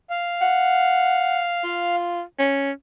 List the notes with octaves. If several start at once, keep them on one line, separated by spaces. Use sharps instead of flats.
F5
F#5
F4
C#4